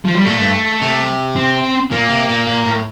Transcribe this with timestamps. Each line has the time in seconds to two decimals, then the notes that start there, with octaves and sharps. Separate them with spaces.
0.05 F3
0.15 G3
0.26 A#2 A3
0.40 G2
0.81 C3
1.36 C4
1.91 A#2 A#3
2.09 C3
2.29 A#2
2.47 A#2
2.66 A2